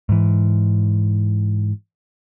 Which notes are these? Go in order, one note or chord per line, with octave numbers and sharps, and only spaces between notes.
G#2 E3